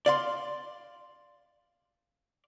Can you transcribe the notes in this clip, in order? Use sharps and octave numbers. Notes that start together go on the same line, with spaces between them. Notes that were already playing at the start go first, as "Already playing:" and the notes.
D5 F5 C6